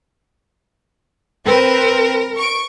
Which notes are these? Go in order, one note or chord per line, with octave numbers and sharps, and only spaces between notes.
C4 A#4 B4
C#6 D7